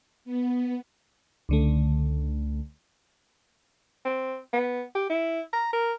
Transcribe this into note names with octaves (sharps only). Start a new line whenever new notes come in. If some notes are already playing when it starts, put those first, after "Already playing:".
B3
C#2 D3 A3
C4
B3
G4
E4
A#5
A#4